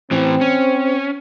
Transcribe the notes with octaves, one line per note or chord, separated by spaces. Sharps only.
A2 E3 C4
C#4